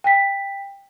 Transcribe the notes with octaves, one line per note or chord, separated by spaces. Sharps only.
G5 B6